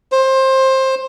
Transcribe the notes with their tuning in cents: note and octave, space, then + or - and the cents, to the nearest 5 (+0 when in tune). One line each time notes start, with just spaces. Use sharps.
C5 +20